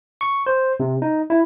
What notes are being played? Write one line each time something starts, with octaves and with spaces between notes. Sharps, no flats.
C#6
C5
C3
D#4
E4